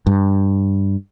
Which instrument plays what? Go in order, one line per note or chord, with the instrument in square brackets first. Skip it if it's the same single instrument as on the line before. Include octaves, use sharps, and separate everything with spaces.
[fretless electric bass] G2